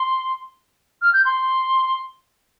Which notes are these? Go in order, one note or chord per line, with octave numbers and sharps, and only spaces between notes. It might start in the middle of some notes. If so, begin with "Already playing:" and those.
Already playing: C6
F6
G6
C6